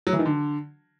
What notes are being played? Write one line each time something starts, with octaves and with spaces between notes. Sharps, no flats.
F#3
E3
D#3
D3